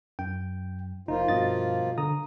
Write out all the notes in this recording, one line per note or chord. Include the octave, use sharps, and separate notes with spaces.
F#2 G5
F1 F3 A#3 D#4 F4
G2 B2 D#5 A6
D3 A#5 D#6